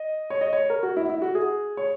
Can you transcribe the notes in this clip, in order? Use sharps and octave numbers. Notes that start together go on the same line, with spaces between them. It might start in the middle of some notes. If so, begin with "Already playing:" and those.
Already playing: D#5
C#5
D#5
C#5
A#4
F#4
E4
E4
F#4
G#4
C#5